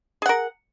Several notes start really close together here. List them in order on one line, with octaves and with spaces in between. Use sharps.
G#4 F#5 A#4